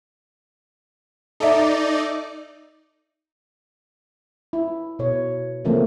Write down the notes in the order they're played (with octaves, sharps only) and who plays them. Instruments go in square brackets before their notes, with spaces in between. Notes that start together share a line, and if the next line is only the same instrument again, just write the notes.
[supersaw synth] D#4 D5 [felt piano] A4 E5
[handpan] E4
B2 C#5
C#3 E3 F3 A3 A#3 C4